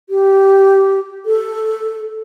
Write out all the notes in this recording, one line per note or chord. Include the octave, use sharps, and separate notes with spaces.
G4
A4